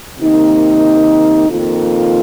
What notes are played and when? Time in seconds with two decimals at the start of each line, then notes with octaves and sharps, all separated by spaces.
0.19 C3 D#3 A#3 D#4
1.49 F2 D#3 A#3 F4